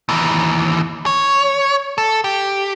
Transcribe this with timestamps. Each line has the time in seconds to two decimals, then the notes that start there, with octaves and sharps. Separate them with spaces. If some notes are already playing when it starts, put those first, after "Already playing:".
0.09 D#2 E3
1.06 C#5
1.98 A4
2.24 G4